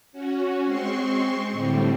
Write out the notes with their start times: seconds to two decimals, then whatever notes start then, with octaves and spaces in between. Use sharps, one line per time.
0.12 C#4 F#4
0.64 G#3 C4 C6 C#6
1.51 A2 D3 G3 C4